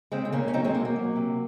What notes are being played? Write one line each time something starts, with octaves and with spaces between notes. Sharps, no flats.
C#3 G#3 C4
C4
C#3 A#3 C#4
C#4
F#3 C4 D#4
G#3 C4
F#3 A#3
A#3
F#3
C3